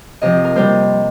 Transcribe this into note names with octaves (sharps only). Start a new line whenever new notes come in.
C3 F3 C4 D#5
A#4
C3 G3 A#3 C5